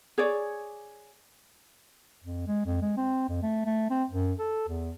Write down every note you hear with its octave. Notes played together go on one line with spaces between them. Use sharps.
G#4 C#5 D5
F2
G#3
F2
G#3
C4
F2
A3
A3
C4
F#2
A4
E2